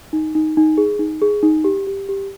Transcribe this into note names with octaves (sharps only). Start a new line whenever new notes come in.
D#4
D#4
D#4
G#4
D#4
G#4
D#4
G4
G4
G4